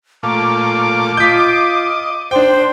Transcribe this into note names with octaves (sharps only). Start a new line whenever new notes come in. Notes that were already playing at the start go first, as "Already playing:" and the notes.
A#2 A3 F4 D6
F4 D#5 G6 B6
D4 C5 G5